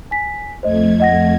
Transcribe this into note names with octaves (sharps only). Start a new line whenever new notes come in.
G#5 B6
F2 A3 C5 D#5 G#6
D#5 F#5 A#6